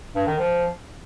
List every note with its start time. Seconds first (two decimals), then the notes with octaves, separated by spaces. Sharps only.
0.15 G2
0.27 D#3
0.39 F3